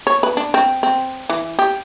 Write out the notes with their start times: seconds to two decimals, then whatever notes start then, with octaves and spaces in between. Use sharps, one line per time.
0.07 C#5
0.23 B4
0.37 D4
0.54 C4
0.83 C4
1.29 E3
1.59 G4